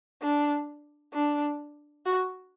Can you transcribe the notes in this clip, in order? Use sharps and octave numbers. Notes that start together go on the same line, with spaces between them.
D4
D4
F#4